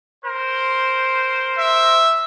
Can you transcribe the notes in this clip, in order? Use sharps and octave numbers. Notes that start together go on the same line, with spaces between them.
A#4 C5
E5